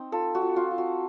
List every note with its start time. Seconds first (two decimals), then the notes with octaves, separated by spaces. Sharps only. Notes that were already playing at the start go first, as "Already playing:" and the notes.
Already playing: C4 D#4
0.12 F4 A4
0.35 F#4
0.42 F4
0.56 F4
0.71 F4
0.78 F#4